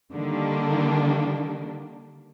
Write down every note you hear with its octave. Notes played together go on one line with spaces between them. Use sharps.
D3 D#3 G3 A#3 D4